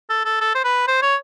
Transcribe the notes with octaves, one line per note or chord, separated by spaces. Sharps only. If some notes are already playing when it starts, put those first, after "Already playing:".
A4
A4
A4
C5
B4
C5
C#5